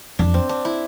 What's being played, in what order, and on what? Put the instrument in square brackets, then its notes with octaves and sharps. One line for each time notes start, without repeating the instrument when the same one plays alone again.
[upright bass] F2 [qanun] D4
[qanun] C4
D4
E4